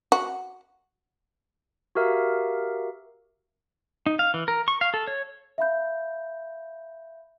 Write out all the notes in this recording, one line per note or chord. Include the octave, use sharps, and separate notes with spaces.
F#4
F#4 G4 A#4 E5 F5
D#4
F5
E3
A#4
C#6
F5
A4
C#5
E5 F5 B5 G6